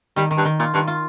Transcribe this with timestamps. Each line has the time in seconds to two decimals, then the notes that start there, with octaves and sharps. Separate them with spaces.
0.16 D#3 G3
0.31 D#3
0.37 G2
0.45 D#3
0.59 A#2 F4
0.74 G2 D#3
0.87 F4